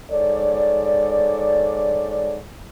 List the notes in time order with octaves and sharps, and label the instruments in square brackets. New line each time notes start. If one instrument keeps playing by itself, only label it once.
[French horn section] G#2 A4 C#5 D5